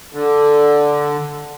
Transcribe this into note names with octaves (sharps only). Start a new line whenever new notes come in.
D3